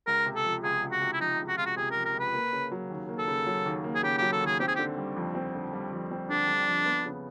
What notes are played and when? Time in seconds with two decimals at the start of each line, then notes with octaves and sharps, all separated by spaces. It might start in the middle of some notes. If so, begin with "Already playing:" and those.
0.07 C#2 A#4
0.26 C3
0.35 A4
0.45 F3
0.63 C#2 G#4
0.83 C#2
0.92 F#4
1.02 C3
1.13 E4
1.20 F3 D#4
1.39 C#2
1.48 F#4
1.57 C#2 F4
1.66 F#4
1.77 C3 G#4
1.91 A#4
1.96 F3
2.05 A#4
2.14 C#2
2.19 B4
2.34 A#3
2.53 C#3
2.72 F#3
2.90 D#2
3.09 A#3
3.18 A4
3.28 C#3
3.47 F#3
3.66 D#2
3.84 A#3
3.95 G#4
4.03 C#3 G4
4.18 F#3 G4
4.32 A4
4.41 D#2
4.46 G#4
4.60 C4 G4
4.68 G#4
4.76 D3 G4
4.97 G3
5.17 F2
5.35 C4
5.55 D3
5.73 G3
5.92 F2
6.11 C4
6.30 D3 D4
6.48 G3
6.68 F2
6.86 B3
7.05 C#3